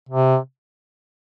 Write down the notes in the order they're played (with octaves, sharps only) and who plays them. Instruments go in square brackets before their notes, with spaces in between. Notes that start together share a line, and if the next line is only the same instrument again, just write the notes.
[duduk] C3